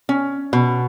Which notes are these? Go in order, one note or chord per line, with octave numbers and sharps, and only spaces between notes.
C#4
B2